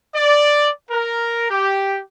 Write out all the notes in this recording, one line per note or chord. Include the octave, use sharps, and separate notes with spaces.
D5
A#4
G4